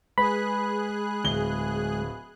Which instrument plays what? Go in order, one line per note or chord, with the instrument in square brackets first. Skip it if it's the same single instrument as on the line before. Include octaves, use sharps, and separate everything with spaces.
[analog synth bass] G#3 [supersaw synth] G#4 F#6 [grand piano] B4 [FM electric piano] B5
[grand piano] D1 G7